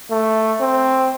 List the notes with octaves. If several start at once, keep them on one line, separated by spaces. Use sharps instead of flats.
A3
C4